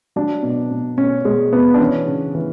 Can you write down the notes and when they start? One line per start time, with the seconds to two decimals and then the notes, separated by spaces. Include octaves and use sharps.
0.16 F#3 D4
0.43 B2
0.71 B2
0.97 B2 C#4
1.25 B2 G#3
1.52 B2 B3
1.74 D4
1.79 E3 C#4
2.08 C#3
2.35 E3